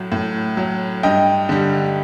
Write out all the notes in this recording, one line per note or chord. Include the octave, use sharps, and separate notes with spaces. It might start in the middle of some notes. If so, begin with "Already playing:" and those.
Already playing: A2 F#3
A2
F#3
G2 D#5 G5
D3 G3